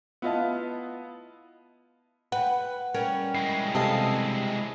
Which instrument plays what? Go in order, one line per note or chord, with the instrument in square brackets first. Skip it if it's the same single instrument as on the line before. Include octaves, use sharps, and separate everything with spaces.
[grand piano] B3 E4 F4 D#5 F5 A5
[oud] B4 [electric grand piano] F#5 G5
[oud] G3 C#4 A#4
[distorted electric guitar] G#3 E4 [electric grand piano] C7
[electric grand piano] C3 [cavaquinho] A4 D#5 F5